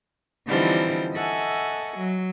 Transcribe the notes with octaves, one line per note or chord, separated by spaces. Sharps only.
D3 E3 F3 G3 C4 D#4
A4 D#5 E5 F#5 G#5 C#6
F#3